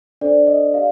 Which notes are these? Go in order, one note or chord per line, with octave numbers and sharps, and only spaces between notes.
D4 A4 C5 D5
D#5
G4 D5 F5